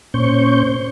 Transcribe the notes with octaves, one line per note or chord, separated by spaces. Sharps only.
A#2 C#4 C5 C#6 G6